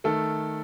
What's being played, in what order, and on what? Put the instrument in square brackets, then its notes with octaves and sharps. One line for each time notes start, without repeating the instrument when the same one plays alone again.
[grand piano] D#3 A3 A4